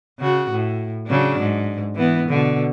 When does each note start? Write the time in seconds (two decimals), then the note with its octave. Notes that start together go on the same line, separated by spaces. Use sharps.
0.19 C#3 F#4
0.50 A2
1.07 C#3 F#3 D4
1.39 G#2
1.95 E3 B3
2.29 B2 D3